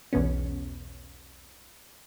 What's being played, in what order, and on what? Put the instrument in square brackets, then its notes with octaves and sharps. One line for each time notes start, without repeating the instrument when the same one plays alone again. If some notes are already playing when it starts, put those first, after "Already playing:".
[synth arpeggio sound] B1 E2 B2 B3 C#4